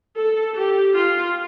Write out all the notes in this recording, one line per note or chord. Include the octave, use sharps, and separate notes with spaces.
A4
G4
F4